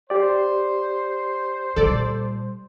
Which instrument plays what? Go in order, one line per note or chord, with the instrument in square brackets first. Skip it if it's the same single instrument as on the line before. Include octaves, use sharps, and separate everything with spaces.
[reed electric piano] G4 D5 [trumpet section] C5
[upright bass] A#2 G3 [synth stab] A4 D5